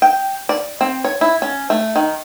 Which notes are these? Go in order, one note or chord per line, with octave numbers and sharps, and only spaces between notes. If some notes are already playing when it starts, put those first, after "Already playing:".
G5
D5
C4
C#5
E4
C#4
A3
D#3